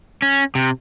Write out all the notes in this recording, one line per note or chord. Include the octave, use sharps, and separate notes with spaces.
C#4
C3